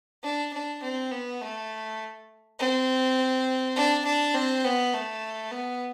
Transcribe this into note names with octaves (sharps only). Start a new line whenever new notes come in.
D4
D4
C4
B3
A3
C4
D4
D4
C4
B3
A3
B3